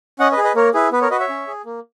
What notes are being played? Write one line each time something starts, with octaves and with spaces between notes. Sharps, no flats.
C#4 D#5 F#5
B4 D#5
G#4
B4 D#5
A#3 A#4 C#5
E4 G#4 B4
B3 B4
A#4 C#5
F#4 B4 D#5
C#5 E5
C#4
G#4
A#3